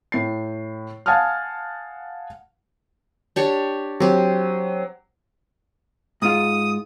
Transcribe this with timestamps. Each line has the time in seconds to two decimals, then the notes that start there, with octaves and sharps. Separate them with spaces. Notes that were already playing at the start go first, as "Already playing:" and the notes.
0.12 A2 C7
1.06 F5 F#5 G#5 A5 D#6 F6
3.36 D4 G4 C#5
4.00 F#3 C4 G4
6.22 G#2 F4 D#6